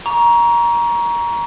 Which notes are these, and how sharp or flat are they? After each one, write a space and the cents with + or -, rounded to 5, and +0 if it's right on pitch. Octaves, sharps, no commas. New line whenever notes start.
A#5 +20 C#6 +25